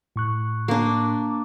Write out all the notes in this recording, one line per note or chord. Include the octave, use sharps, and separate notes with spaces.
A2 C#6 F#6
A#3 D4